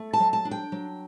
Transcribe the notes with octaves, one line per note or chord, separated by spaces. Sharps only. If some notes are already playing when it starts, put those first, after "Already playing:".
Already playing: A3
A5
F#3
A5
D4
G5
F#3